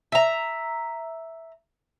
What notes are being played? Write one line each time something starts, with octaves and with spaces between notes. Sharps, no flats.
E5 A#5